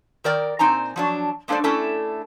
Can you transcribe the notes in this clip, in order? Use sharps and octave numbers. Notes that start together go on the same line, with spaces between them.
D#3 A#4 D5 G5
A#2 C4 D#4 G#5 A#5
F3 F#3 D4
G#3 A#3 D4 A4 C5 D5
A3 C#4 D4 E4 A4